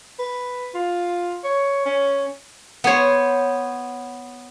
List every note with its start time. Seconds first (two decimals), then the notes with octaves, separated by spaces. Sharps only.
0.19 B4
0.74 F4
1.44 C#5
1.86 C#4
2.84 B3 C5 C#5